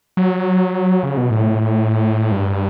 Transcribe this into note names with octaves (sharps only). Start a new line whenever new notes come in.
F#3
C#3
B2
A2
G2